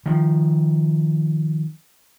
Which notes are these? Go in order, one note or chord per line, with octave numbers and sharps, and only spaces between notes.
D#3 F3